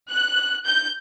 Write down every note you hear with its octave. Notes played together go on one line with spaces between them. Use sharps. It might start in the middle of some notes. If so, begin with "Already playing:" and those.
F#6
G6